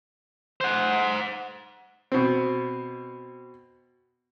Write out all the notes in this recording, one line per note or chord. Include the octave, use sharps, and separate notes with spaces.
C5 F#5
B2 C4